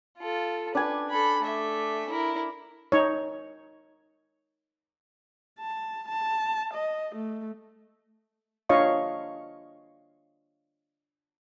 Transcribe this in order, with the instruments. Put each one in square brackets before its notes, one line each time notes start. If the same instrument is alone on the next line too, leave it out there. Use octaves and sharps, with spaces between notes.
[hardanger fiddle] F4 A4
[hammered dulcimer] D4 D5 G#5 [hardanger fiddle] B4
[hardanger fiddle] A4 B5
A3 E5
E4 A#4
[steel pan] D#4 C#5
[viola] A5
A5
D#5
A3
[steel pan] D4 F4 C#5 D#5 F5 C#6